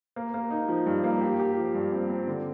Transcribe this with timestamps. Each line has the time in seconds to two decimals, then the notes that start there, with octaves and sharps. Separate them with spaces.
0.16 A#3
0.34 A#3
0.51 D#4
0.68 F3
0.86 G2
1.04 A#3
1.21 G4
1.39 G4
1.57 F3
1.74 G2
1.92 C4
2.10 C4
2.27 D3